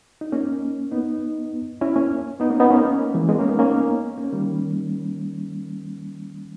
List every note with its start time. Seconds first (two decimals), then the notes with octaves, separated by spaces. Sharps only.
0.21 D#4
0.32 A#3 C#4
0.91 B3 D#4
1.81 C#4 E4
1.96 A#3 C#4
2.40 B3 D#4
2.50 A#3 C#4
2.60 B3 D#4
2.70 A#3 C#4
2.85 A#3 C#4
3.14 E3 G#3
3.29 G#3 B3
3.39 A#3 C#4
3.48 B3 D#4
3.59 A#3 C#4
4.18 A#3 C#4
4.33 D#3 G3